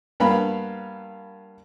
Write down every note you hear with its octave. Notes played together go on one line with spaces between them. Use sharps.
G2 A#3 B3 F5 B5